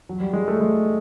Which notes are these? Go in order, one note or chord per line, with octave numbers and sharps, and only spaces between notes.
F#3
G3
G#3
A3
G#3